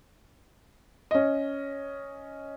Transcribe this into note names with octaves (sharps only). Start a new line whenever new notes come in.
C#4 D#5